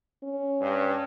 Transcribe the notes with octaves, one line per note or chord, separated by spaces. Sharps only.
C#4
G2